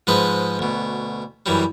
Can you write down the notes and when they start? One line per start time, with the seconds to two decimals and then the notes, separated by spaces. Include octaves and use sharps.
0.07 G#2 F3 G#3 B4 D#5
0.59 D2 B2
1.46 F#2 E3 F#3 G3